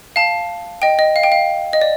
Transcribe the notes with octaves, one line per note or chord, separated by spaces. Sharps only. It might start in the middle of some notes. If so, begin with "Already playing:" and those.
F5 A5
D#5 G5
D#5
F5
G5
F5
D#5
D5